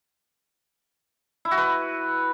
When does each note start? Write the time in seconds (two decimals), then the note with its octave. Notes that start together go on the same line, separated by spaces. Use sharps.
1.45 E4
1.51 F#4
1.58 B4